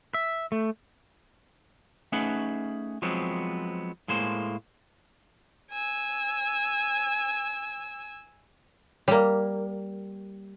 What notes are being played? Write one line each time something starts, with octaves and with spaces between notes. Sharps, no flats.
E5
A3
A3 C#4 D#4 G#4 B4 F#5
F3 F#3 G#3 B3 C4
A2 G#3 A#3 C5
G#5 E6
G3 A#3